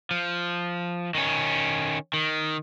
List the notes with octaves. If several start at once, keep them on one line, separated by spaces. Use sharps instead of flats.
F3
D#3 C#4
D#3